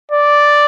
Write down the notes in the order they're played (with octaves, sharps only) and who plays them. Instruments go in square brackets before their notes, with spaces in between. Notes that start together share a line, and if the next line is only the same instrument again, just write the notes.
[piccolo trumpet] D5